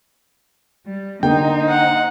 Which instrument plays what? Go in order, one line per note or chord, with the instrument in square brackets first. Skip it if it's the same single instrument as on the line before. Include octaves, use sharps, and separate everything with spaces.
[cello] G3
[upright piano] D3 A#3 [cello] D#4 C5 [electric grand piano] G5
[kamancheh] F#5